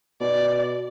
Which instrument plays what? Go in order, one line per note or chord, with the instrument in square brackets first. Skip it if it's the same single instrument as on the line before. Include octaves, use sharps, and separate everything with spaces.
[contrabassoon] B2 [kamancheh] D5